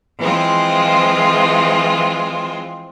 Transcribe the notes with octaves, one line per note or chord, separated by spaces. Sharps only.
E3 F3 G#3 C4 F4